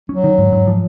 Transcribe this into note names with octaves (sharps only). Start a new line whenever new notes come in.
F#3 C#4
D#3
G#2
G#2
F3